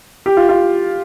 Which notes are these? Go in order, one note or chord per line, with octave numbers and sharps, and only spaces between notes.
G4
F4
F4